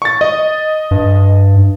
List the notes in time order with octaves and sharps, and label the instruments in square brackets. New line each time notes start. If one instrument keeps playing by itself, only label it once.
[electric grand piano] C#6 A6
D#5
[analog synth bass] G2